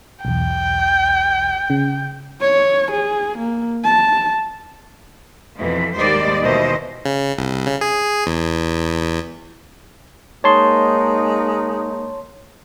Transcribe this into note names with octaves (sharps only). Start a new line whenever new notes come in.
B1 E2 G5
C#3
C#5
G#4
A#3
A5
F2 B2 E3
D#2 G#2 G3 C5 D5 D#5
D#2 B2 D#3 E3 C5 D#5
C#3
C2
C#3
G#4
E2
E2
G#3 A#3 D#4 C#5 A5 C6